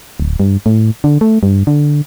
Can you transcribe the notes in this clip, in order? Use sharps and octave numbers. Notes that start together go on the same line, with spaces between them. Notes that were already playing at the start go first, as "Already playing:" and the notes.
D1
G2
A2
D3
A3
G2
D3